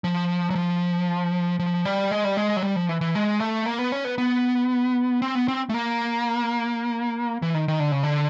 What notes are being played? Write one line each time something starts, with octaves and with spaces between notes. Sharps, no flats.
F3
F#3
F3
F3
G3
G#3
G3
G#3
F#3
G3
F3
E3
E3
G#3
A3
A#3
B3
C#4
B3
B3
C4
B3
C4
A3
A#3
E3
D#3
D#3
D3
C#3
D3